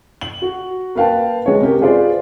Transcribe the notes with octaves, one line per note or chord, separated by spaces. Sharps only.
F#7
F#4
A#3 B4 F5 G5 A5
G#3 C#5
C3 C#4 G4 A#4
F4 G#4 B4 C5 D5